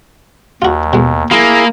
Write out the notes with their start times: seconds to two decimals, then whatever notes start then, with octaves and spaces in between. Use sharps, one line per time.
0.62 D#2 F4 F#4
0.93 B2 G#3
1.31 A#3 E4 F4 G#4